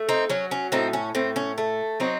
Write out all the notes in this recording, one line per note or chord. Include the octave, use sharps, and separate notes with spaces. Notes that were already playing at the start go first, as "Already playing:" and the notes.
Already playing: A3
C4 D#4
F#3 C#4
C#4
A2 C4 D#4
C#4
A2 C4
C#4
A3
F#3 C4 D#4